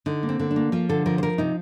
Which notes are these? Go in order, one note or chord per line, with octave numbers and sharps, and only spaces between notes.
D3 D#4
A#3
C4
D3
D4
A#3
F3 F4
D3 A4
F3 A#4
C5
F3 A#4
C3 D#4